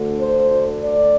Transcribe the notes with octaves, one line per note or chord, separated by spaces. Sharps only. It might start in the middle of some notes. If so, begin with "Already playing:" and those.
Already playing: D2 D3
C5
D5